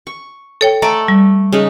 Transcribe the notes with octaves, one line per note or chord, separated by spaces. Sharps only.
C#6
A4 C#5 G5
A3 A4 D5 A#5
G3
C#3 G#3 D#4